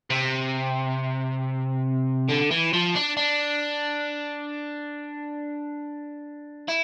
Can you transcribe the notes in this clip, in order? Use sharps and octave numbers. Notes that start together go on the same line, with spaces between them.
C3
D3
E3
F3
D4
D4
E4